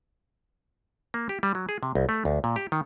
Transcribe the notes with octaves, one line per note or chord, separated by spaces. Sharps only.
A#3
G4
G3
F#3
G#4
C3
C2
A3
D2
A#2
G4
D#3